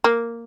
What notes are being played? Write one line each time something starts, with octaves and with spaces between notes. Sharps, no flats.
A#3